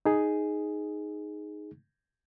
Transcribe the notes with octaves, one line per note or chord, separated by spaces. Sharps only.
D#4 G#4